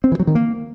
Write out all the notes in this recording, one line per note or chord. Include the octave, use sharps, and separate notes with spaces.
C4
E3
F#3
D#3
A#3